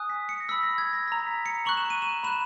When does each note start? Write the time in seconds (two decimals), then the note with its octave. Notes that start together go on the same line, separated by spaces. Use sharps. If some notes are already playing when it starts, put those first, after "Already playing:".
Already playing: G#5 D#6 F#6
0.09 B6
0.29 C#7
0.40 A#6
0.48 B5 E6 B6
0.63 A#6
0.78 G#6
0.93 A#6
1.07 A#5 E6 A#6
1.27 B6
1.46 C#7
1.65 A#5 C#6 F#6 F#7
1.77 E7
1.90 D#7
2.02 E7
2.24 B5 F#6 E7